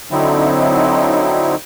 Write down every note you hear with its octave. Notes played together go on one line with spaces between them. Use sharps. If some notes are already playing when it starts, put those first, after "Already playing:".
D3 F#3 C4 D#4 E4